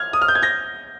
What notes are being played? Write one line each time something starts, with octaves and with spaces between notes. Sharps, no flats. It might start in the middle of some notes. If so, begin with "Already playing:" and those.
Already playing: F6 G#6
D#6
F6
G6
G#6
G6 A#6